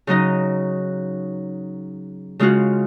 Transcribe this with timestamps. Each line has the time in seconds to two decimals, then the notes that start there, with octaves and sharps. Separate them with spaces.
0.07 C#3 F#3 D#4 D#5
2.39 C#3 G#3 C#4 F4 F#4